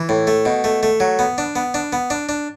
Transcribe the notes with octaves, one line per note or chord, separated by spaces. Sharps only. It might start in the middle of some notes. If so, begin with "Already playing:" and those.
Already playing: E3
A2
A3
B2
A3
A3
F#3
B3
D4
B3
D4
B3
D4
D4